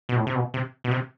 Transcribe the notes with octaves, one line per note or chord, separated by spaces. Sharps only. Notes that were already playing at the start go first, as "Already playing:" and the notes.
B2
A2
C3
B2
C3
B2
C3